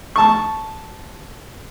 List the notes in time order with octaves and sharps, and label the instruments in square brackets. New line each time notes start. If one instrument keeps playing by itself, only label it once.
[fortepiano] A5 C#6